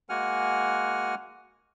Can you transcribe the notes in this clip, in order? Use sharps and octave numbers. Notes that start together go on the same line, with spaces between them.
G#3 A#3 F#4 F#5 G#5 F6